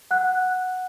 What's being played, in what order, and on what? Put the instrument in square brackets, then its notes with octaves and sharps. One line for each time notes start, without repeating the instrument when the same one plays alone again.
[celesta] F#5 F#6